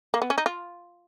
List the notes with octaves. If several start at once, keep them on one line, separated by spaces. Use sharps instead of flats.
A#3
B3
C#4
D#4
F4